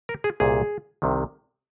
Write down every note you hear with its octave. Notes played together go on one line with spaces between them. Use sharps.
A#4
G#4
C2 A#2 G#4
C2 C3 D#3